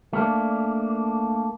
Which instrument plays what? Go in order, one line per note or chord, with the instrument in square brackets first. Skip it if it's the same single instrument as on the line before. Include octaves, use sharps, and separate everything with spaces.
[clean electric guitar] A3 A#3 D4